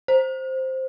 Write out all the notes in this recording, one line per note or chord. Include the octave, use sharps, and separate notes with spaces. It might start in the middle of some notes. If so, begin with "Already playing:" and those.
C5